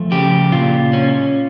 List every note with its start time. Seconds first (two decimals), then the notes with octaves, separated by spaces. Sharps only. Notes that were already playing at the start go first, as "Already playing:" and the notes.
Already playing: F3 A3
0.11 C#3 G4
0.52 A#2 F4
0.93 C#4